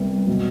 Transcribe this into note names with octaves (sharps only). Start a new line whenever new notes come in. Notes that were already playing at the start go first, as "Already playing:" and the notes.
Already playing: C2 C3 G3 B3
B2 F#3